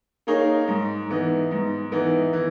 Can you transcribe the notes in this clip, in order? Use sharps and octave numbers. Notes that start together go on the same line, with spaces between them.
A#3 D#4 G#4 C#5
G#2
E3 B3 D#4
G#2
E3 B3 D#4
E3